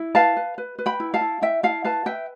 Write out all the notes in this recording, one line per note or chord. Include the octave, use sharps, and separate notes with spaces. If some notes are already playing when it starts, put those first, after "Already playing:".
Already playing: E4
B4 F5 A5
B4
B4
B4
G5 B5
E4
F5 A5
E4
E4 E5 G5
E4 F5 A5
B4 F5 A5
B4 E5 G5